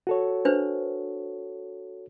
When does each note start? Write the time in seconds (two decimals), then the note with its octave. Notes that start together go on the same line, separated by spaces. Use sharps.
0.07 F#4 A4 C#5
0.45 D4 B4 C5